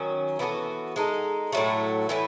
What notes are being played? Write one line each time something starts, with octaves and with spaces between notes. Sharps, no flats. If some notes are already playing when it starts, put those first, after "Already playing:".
Already playing: D#3 F#3 C#4
E3 B3 F#4 A4
G#3 D#4 A4
A2 F#3 A3
A2 E3 B3